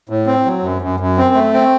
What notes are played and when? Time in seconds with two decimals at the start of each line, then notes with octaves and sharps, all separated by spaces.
0.09 A2
0.27 C4
0.45 F#3
0.63 F#2
0.82 F#2
1.00 F#2
1.17 C4
1.35 A3
1.53 C4